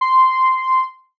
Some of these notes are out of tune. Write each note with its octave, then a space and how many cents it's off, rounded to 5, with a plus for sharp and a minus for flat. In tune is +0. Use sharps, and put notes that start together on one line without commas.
C6 -10